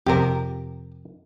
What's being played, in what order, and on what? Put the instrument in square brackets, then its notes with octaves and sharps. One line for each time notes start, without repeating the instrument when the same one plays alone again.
[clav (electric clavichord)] F2 C3 [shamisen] G4 A#4